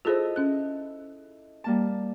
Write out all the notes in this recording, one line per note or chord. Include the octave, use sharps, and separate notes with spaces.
E4 F4 G#4 A4 C5 D#5
C#4 F#6
G3 A#3 A5